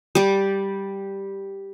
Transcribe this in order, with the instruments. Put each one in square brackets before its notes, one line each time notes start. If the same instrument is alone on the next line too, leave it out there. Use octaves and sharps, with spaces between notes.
[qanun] G3 D5